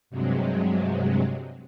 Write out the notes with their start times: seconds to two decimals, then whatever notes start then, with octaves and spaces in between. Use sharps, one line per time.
0.10 G2 C3 F#3 G#3